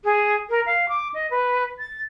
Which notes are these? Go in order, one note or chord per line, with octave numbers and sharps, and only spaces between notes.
G#4
A#4
F5
D6
D#5
B4
A6